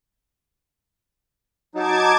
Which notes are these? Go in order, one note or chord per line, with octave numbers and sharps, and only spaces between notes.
F#3 D#4 A5 D6 G#6